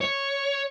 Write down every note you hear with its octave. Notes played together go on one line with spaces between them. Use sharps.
C#5